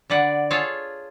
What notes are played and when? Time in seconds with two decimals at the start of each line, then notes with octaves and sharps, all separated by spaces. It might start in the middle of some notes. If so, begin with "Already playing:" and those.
0.10 D3 B4 D5 F#5
0.50 F4 G#4 A4 C#5 F5